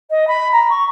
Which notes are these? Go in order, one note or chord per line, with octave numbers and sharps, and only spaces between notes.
D#5
B5
A#5
C#6